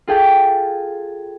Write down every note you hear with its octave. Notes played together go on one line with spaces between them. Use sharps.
F4 G#4 A4 G5